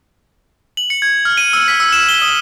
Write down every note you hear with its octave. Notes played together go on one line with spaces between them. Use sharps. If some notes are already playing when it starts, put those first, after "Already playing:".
F#7
C#7
G#6
F6
D#7
E6
B6
E6
E7
G7
D#6